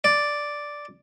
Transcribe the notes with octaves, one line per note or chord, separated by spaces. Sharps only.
D5